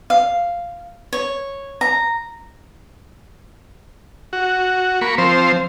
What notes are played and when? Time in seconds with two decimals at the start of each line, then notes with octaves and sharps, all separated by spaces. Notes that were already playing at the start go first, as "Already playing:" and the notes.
0.10 F5
1.13 C#5
1.81 A#5
4.33 F#4
5.01 A#3 B5 C#6
5.18 F3 C4 C5